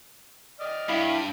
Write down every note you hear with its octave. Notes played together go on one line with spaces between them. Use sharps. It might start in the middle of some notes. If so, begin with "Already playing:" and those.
D5 D#5 F6
G2 E4 F5 B5